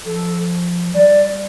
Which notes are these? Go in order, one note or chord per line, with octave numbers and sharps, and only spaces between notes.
F3 A4
F3
G3 D5